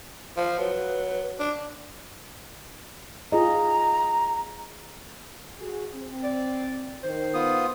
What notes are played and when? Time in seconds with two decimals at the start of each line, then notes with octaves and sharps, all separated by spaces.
0.37 F3
0.59 F#3 B4
1.39 D4
3.32 F4 G#4 D#5 A#5
5.60 F#4 G#4
5.94 C4
6.24 D5
7.03 D#3 C5
7.34 B3 F4 D#6